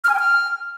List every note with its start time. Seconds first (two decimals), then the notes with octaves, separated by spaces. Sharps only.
0.04 F6
0.09 G#5
0.14 G5
0.19 F6